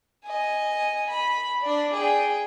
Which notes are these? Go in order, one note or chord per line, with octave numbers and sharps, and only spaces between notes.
D#5 G#5
B5
D4 D5
G#4 G5